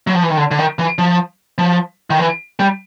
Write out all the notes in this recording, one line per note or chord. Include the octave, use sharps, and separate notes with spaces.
F#3
F3
E3
D#3
D3
D3
D#3
E3
F3
F3
D#3
E3
G3